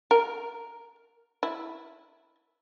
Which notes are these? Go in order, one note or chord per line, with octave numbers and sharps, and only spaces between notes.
A#4
E4